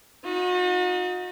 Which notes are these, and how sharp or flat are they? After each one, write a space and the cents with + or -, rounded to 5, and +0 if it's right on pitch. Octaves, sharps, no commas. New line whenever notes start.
D#4 +20 F#4 -40